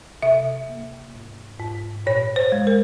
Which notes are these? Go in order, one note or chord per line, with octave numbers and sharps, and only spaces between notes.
C3 E5
A#3
G#2
G#2
A#2 C#5
C5
G#3
A#4